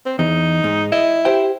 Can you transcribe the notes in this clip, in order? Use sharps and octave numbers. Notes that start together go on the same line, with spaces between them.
C4
E2 D#4
G#2
E4 D#5
G4 C5 G5